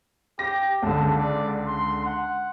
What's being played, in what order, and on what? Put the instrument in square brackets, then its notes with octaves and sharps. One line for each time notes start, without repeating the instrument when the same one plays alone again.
[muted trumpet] G4 [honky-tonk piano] A#6
[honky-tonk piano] C#2 D3 [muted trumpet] A5
[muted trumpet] D5
C6
F#5